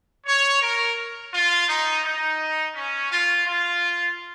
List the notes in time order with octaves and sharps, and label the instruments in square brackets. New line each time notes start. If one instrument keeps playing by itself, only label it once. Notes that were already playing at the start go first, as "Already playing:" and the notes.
[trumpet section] C#5
A#4
F4
D#4
D#4
C#4
F4
F4